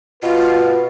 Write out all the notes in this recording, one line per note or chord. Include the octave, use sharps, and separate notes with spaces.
B2 F4 B4